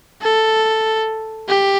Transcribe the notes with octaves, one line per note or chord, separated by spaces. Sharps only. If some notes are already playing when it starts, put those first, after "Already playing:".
A4
G4